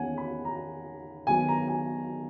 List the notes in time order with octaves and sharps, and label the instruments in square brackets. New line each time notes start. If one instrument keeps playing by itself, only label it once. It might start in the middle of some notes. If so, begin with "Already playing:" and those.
Already playing: [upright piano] E2 D#3 A#3 C#4 F#5 G#5
B5
A#5
D#2 D#3 F#3 B3 G#5
A#5
G#5